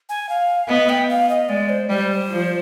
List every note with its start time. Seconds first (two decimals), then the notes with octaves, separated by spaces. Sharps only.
0.09 G#5
0.29 F5
0.68 B3 D#5
0.89 G5
1.09 F5
1.29 D#5
1.49 G#3 D5
1.69 C5
1.89 G3 C5
2.30 F3